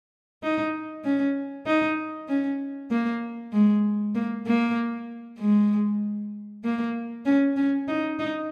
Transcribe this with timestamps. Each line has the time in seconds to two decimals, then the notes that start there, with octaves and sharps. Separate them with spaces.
0.43 D#4
1.04 C#4
1.66 D#4
2.28 C#4
2.91 A#3
3.53 G#3
4.15 A#3
4.47 A#3
5.39 G#3
6.64 A#3
7.26 C#4
7.56 C#4
7.88 D#4
8.19 D#4